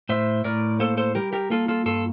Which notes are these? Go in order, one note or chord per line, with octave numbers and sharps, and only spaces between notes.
A2 C5 E5
A2 A#4 D5
A#3 A4 C5
A4 C5
G3 G4 A#4
G4 A#4
A#3 F4 A4
F4 A4
G2 F4 A4